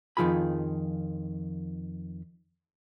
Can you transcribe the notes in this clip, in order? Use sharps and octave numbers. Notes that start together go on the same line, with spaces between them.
F2 D#3 F3 F4 G#4 B5